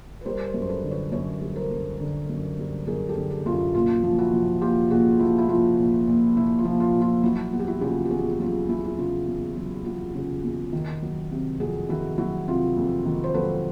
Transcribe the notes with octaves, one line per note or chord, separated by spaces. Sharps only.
B4
G3 A#4 C5
A#4 C5
F#2
C5
A4 B4
D3
B4 C#5
F#2 B4 C#5
G3
A#4 C5
F#2
D3
F#2
G3
F#2 G#4 A#4
G4 A4
D3
G4 A4
F#2 F4
E4
A#2 F4
F3
E4 F#4
F3
A#2 F4 G4
A#2 F#4 G#4
F3 E4
E4
F3 F4
A#2
A#2
F3 E4
F4
F3
F4
A#2
F4
F#3 E4
E2 F#4
G4
E4 F#4
C#3 F4 G4
G4
E2 F#4 G#4
F#4
F#3 F4
E2 E4
E4
C#3 F4
E2
F#3
E2 E4 F#4
C#3
E2
D#3
F#3
C3
F2 F#4 G#4
D#3 E4 F#4
F#3 E4 F#4
C3 F4
F2
D#3
C5
F#3 A4 B4